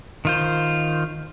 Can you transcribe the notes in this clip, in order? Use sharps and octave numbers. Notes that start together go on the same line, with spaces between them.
D#3 F4 C5